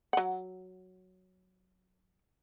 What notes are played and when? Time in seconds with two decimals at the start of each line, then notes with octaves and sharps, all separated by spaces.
0.13 F#3 F#5